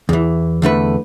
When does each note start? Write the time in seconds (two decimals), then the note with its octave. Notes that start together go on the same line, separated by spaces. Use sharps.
0.09 E2 E3
0.62 E2 D3 A3 B4